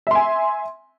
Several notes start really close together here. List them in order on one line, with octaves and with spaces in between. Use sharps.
E5 C6 G#5